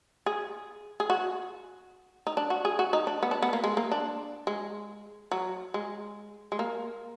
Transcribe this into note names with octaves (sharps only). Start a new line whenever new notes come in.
G#4
G#4
F#4
D#4
D4
F#4
G#4
F#4
D#4
D4
B3
D4
B3
A#3
G#3
A#3
D4
G#3
F#3
G#3
G#3
A#3